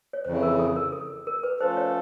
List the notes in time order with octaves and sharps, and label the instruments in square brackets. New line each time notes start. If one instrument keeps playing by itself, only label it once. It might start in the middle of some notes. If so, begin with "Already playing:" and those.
[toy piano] C#5
[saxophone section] F2 C#3 E3 [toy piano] C5
[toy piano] A#4
A4
A#4
A4
A#4
B4
[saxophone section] F3 A3 C#4 F4 A4 [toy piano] C5
[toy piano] C#5